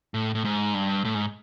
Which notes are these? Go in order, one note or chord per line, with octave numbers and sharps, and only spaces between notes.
A2
A2
G#2
G2
A2
G#2